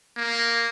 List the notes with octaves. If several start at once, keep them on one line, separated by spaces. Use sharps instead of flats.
A#3